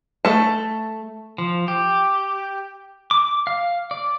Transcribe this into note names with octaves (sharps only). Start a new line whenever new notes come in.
A3 A5
F3
G4
D6
F5
D5